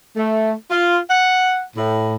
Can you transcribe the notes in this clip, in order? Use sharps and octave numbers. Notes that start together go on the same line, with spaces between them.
A3
F4
F#5
A2